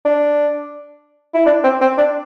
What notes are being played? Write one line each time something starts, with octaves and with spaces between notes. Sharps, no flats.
D4
E4
D4
C4
C4
D4